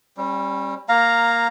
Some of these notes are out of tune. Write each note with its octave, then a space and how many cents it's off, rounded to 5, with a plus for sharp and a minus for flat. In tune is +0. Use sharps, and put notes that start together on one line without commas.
G3 +0 C#4 -35
A#3 +0 F5 +5 A#5 -5